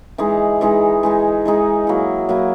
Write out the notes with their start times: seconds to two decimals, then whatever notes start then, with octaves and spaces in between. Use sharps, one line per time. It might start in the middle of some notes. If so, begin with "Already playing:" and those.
0.18 E3 G#3 D#4 G#4
0.61 E3 G#3 D#4 G#4
1.03 E3 G#3 D#4 G#4
1.46 E3 G#3 D#4 G#4
1.87 F#3 A#3 E4
2.29 F#3 A#3 E4